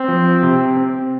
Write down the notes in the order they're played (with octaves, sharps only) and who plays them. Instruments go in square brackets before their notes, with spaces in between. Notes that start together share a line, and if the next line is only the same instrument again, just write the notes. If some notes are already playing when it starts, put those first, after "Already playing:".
Already playing: [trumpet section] C4
[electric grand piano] F3
C3
C4